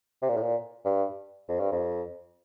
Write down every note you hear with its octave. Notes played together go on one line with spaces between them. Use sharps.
C3
A#2
A2
A#2
G2
F2
G2
F2